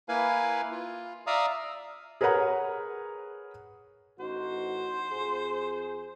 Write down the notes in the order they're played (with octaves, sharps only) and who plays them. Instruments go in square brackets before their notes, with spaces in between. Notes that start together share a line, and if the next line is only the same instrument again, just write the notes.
[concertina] A#3 E4 B4 F5 G#5
F4
D5 E5 F5 A#5 D#6
[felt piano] G#4 A#4 B4 C#5 F#5 A#5
[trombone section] A1 D#4 F#4 [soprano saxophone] C5
[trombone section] F2 G#4